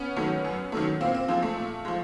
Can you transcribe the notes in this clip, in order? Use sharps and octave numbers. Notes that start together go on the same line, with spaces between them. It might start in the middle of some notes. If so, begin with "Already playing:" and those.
Already playing: B3 C#4
D#3 F#3 A3
F#2
D#3 F#3 A3
A#2 A#3 C4
A#3 C4
F3 G#3 A#3 C4
A3
A#2
F3 G#3